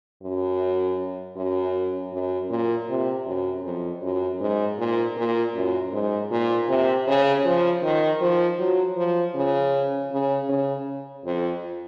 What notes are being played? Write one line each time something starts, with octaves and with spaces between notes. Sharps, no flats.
F#2
F#2
F#2
A#2
C3
F#2
F2
F#2
G#2
A#2
A#2
F#2
G#2
A#2
C3
C#3
F3
D#3
F3
F#3
F3
C#3
C#3
C#3
F2